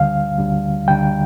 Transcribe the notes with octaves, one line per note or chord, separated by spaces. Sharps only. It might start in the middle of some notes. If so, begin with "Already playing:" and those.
Already playing: D2 D3 G3 F5
D2 D3 G3
D2 D3 G3 G5